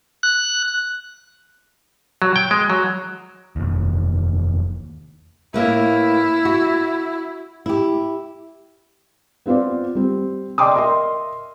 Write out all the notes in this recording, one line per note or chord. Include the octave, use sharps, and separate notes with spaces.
F#6
F#3
G5
G#3
F#3
F1 D#2
A2 A#3 E4 B4
F#4
E4 G4
B3 C4 F4 C5 D5
G3 C4
D5 D#5 G5 C6 D6 D#6
A#4 D#5 E5 C6